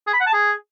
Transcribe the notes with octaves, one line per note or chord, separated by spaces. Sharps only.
G#4
B5
F#5
A5
G#4